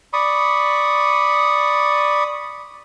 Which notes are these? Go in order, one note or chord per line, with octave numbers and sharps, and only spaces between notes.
D5 B5 C#6 D#6